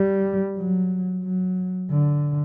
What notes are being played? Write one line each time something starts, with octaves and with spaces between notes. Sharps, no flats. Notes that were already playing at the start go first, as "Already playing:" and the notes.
Already playing: G3
F#3
F#3
D3